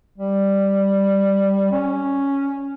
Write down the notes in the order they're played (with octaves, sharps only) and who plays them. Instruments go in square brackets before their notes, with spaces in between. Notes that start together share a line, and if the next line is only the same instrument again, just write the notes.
[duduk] G3
C#4